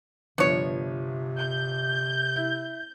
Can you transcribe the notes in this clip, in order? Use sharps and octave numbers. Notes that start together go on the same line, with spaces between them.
G1 C3 F3 B3 C#5
G6
E4